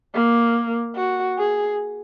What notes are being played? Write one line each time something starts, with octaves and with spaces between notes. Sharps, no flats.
A#3
F#4
G#4